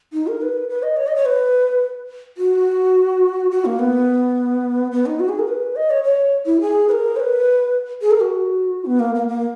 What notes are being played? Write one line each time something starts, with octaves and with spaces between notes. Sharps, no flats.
D#4
A#4
B4
B4
D#5
C#5
D#5
C#5
B4
F#4
F#4
A#3
B3
B3
D#4
F#4
G#4
A#4
B4
D#5
C#5
C#5
E4
G#4
B4
A#4
C#5
B4
G#4
A#4
F#4
B3
A#3
A#3
A#3